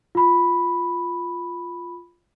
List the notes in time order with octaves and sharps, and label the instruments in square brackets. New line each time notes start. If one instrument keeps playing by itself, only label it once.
[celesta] F4 B5